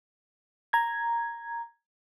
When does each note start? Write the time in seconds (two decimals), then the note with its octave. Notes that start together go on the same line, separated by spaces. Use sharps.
0.73 A#5 G#6